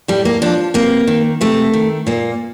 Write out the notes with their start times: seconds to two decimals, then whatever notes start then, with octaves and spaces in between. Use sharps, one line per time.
0.08 A2 G3
0.25 A#3
0.42 F3 D4
0.74 C3 A#3
1.07 D#3
1.41 C3 A3
1.73 D#3
2.07 A#2 A#3